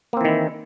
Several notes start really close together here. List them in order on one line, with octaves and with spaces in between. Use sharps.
A#3 C4 E3 D#3 E4